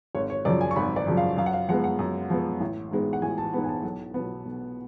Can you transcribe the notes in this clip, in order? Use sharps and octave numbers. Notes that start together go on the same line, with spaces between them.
G#1 C#5
C#5
F#2 C#3 F3 D5
G#5
C#6
G#1 B5
D5
F#2 C#3 F3
F5
F#2 F5
F#5
F5
F3 G#3 B3 F#5
F#5
F#2
F3 G#3 B3
A1
G#2 G#3 B3
F#5
A1 G#5
A5
G#2 G#3 B3
G#5
A5
B1
B2 F#3 B3
B1